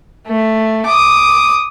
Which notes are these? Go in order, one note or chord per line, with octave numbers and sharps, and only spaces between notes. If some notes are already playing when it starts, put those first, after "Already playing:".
A3
D6 D#6